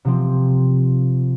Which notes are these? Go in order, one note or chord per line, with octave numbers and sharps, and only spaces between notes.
C3 F3 C4